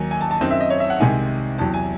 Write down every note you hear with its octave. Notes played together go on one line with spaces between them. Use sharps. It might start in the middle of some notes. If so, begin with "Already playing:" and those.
Already playing: D#2 D#3 F#3 G#5
G#5
A5
A5
F#2 D#3 F#3 C4 D#4
E5
D#5
C#5
E5
F#5
C2 C3 D#3 G#3 G#5
E2 C3 F#3 A5
G#5